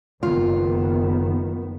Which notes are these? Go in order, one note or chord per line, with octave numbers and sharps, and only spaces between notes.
F#1 D#3 B3 F4